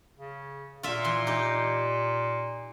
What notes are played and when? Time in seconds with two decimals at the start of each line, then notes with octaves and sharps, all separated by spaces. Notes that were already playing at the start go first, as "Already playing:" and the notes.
0.17 C#3
0.83 A#2 F4 E5
1.04 E3 C6
1.27 D#4 G4